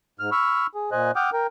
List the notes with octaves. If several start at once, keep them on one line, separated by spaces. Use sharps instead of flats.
G#2 F6
B5 C#6 E6 F6
G#4
A#2 C5 D#5 G#5 F#6
F#5 G5 D6 D#6 F6 G6
A#4 G5